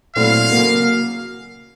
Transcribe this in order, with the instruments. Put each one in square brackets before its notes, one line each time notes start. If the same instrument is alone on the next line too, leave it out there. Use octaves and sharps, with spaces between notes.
[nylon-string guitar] A#2 F#3 A3 C4 E4 [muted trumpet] F5
[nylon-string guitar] C#3 F#3 A#3